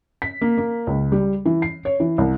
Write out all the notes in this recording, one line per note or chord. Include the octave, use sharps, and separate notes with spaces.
B6
A#3
A#3
C#2
G3
E3
C7
C#5
E3
C2